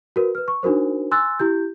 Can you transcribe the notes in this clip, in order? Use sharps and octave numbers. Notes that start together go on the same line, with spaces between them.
F#4 A#4 B4
B4 F6
C#6
D4 D#4 F#4 A#4 C5
G#5 C6 E6 F#6 A6
E4 G4 G6